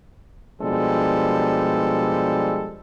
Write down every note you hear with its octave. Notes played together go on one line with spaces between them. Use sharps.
B2 F3 G3 G#3 D4 A4